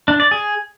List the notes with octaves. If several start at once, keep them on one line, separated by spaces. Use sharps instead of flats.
D4
D5
G#4